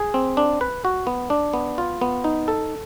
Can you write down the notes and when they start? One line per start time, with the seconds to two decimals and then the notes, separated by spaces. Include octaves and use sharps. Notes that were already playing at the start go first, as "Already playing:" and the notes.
Already playing: G#4
0.14 C4
0.37 D4
0.61 B4
0.85 F#4
1.07 B3
1.30 D4
1.53 B3
1.78 F4
2.01 B3
2.24 D#4
2.48 A4